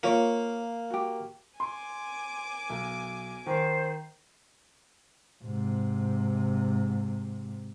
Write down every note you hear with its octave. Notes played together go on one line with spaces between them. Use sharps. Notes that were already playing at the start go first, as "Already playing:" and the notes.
A#3 F4 A#4 C#5
F#4 G4
G#5 C6 D6
B1
D#3 C5
G#2 C3